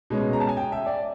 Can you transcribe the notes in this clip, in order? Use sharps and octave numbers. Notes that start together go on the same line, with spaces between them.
B2 G#3 C#4
A#5
A5
G#5
G5
E5
D5